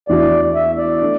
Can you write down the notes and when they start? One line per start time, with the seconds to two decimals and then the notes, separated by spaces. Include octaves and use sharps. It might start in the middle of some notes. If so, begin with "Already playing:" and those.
0.08 E2 E3 D4 F#4 D5
0.55 E5
0.78 D5
1.02 A3 D4